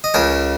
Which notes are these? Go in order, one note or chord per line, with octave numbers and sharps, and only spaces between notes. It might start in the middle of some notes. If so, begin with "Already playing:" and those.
D#5
C#2 C#3 A#4 C#5